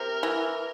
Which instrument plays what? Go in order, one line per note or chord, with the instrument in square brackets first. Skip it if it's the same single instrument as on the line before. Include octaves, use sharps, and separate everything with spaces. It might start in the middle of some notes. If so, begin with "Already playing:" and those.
Already playing: [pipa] C3 [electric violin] A#4
[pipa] E3